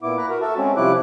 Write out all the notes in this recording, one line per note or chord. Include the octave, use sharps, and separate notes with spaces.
A#2 B3 E4 D6
A#5 B5 F#6
F#4 A#4
F#4 A4 E5 A5
G#3 C4 C#4
C3 F3 G3 E4 D6 F#6